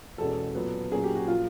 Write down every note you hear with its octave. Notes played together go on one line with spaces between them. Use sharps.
E2 B2 G#3 C#4 A4
A#2 F#3 B3
A#2 F#3 A#3 C#4 G#4
G4
F#4
A#2 F3 A#3 F4